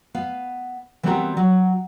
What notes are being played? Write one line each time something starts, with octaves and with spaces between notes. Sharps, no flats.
B3 F5
E3 G3 B3 C4 F#4 A#4
F#3